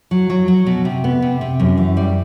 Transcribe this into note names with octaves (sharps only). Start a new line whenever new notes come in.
F#3
F#3
F#3
B2
C3
B3
C3
C3
F#2
E3
G3